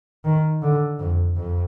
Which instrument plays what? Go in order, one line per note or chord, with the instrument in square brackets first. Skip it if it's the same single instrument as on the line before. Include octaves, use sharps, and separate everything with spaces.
[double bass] D#3
D3
F2
F2